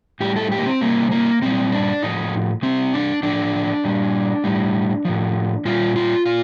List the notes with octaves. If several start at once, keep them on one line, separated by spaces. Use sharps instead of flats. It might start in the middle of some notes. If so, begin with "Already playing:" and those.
A2 G3 G4
A4
G4
A#3
C4
C3 G3 A#3
A#3
A#2 G3 C4
D4
A2 F3 D#4
C3 G3 C4
D4
A2 F3 D4
A#2 G3
A2 G3
A2 F3
A#2 G3 F4
F4
A#2 F4